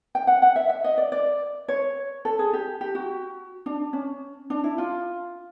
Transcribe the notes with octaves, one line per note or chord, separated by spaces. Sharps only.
G5
F#5
F#5
E5
E5
D#5
D5
D5
C#5
A4
G#4
G4
G4
F#4
D4
C#4
D4
E4
F4